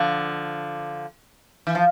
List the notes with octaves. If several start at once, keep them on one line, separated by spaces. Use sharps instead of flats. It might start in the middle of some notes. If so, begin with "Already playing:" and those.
Already playing: D3 F3
E3
F3